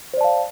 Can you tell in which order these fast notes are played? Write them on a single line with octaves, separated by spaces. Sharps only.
C5 D5 A5 F5